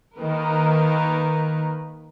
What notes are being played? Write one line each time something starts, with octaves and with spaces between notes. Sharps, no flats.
D#3 A#3 A#4 B4